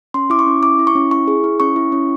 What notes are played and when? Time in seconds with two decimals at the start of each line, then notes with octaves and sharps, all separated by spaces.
0.14 C#4 C6
0.30 E4 D6
0.39 C#6
0.47 C#4
0.63 E4 D6
0.79 E4
0.87 C#6
0.95 C#4
1.11 E4 C#6
1.28 G#4
1.44 E4
1.60 C#4 C#6
1.76 E4
1.92 C#4